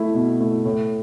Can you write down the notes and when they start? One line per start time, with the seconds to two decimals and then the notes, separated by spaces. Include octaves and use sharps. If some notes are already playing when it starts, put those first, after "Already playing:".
Already playing: A3 E4
0.14 B2
0.40 A3 E4
0.65 A2